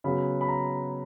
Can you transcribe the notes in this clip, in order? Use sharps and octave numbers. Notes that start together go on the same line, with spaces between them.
C#3 F#3 B3 B5
B5
A#5